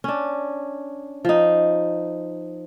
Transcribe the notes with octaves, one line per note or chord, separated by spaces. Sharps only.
C#4 D4
F3 D#4